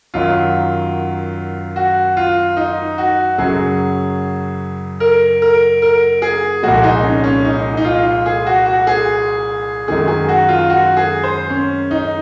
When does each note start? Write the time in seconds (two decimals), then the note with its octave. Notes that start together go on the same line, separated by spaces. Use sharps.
0.14 F#2 D#3 F#3 F4
1.76 F#4
2.17 F4
2.57 D#4
2.98 F#4
3.38 F#2 C#3 F#3 G#4
5.00 A#4
5.42 A#4
5.82 A#4
6.22 G#4
6.63 C2 A#2 F3 G#3 F#4
6.83 D#4
7.03 C#4
7.24 C#4
7.44 D#4
7.77 D#4
7.85 F4
8.26 G#4
8.46 F#4
8.65 F#4
8.87 G#4
9.88 F#2 D#3 G#3 G#4
10.08 G#4
10.28 F#4
10.49 F4
10.70 F#4
10.97 G#4
11.23 C5
11.50 C#4
11.91 D#4